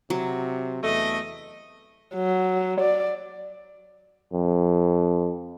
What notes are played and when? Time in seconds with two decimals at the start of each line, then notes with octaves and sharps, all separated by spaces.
0.10 C3 F#3
0.84 E2 A3 D#5
2.15 F#3
2.81 D5
4.33 F2